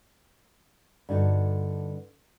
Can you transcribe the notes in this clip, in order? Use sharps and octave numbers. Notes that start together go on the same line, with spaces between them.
G2 D3 D#4 F#4